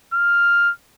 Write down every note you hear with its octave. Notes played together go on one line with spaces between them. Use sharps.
F6